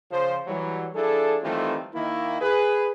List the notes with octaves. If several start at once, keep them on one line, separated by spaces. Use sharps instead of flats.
C#3 F3 C5
E3 F#3 G3
F3 D4 E4 G#4 A4
D#3 E3 G3 A3 C4 F4
D#3 A#3 E4
G#4 B4